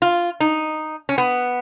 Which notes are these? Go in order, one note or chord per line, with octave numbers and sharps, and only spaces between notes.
F4
D#4
C#4
B3